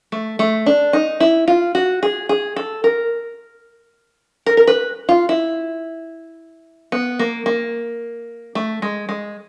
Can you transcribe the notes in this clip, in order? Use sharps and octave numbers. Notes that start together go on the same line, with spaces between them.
A3
A3
D4
D#4
E4
F4
F#4
G#4
G#4
A4
A#4
A#4
A#4
B4
F4
E4
B3
A#3
A#3
A3
G#3
G#3